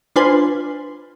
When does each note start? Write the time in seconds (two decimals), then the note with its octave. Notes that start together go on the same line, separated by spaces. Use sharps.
0.16 D4 F4 B4 C5 G#5 C6